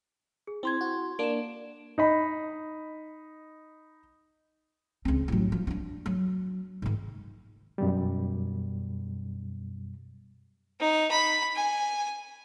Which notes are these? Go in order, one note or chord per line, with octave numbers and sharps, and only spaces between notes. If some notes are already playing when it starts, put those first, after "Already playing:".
G#4
C4 E4 C6 G#6
F#4
A#3 D4 D7 E7
D#4 D#5 B5
C#2 C4
A1 F#3
F3
C#4 D4
F#3
G#2 D#3
F#2 B2 G3
D#4
B5
G#5